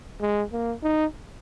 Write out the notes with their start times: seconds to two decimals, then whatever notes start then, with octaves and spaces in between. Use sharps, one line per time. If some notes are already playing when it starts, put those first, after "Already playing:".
0.21 G#3
0.52 A#3
0.83 D#4